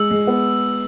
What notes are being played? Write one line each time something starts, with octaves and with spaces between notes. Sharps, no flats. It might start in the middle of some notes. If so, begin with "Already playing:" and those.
Already playing: G#3 E6
G#3
B3